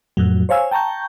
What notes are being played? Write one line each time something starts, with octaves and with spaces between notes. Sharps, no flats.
F2 A2 F#3
C5 C#5 F5 G#5 E6
G5 A5 A#5 C#6 G6